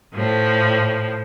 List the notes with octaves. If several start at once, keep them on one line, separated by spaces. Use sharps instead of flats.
A2 F3